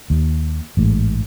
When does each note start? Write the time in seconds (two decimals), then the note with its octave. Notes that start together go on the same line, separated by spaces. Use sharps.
0.10 D#2
0.77 A1 G#2